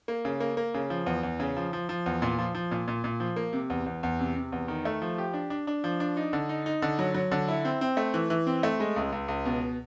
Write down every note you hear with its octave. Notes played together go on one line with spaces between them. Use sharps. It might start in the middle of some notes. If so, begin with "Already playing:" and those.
A#3
C#3
A#3
A#3
C#3
F3
E2
E2
C#3
F3
F3
F3
E2
A#2
F3
F3
A#2
A#2
A#2
F3
A#3
C3
E2
E2
E2
C3
C3
E2
D#3
A3
F3
G4
D4
D4
D4
F3
D4
D#4
D3
D#4
D#4
D3
F#3
F#3
D3
E4
C4
C4
A3
E3
E3
C4
A3
G#3
C#2
C#2
C#2
B2